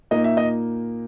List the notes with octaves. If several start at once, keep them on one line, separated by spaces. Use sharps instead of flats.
A#2 A#3 D#4 D#5
E5
D#5